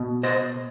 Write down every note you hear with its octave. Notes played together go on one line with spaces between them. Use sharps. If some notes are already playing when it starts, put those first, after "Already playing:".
Already playing: B2
C5 D#5